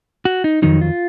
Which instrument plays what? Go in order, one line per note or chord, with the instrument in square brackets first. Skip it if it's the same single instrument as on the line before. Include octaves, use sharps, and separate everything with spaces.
[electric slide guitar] F#4
D#4
F2 D#3 F#3 D#4
F4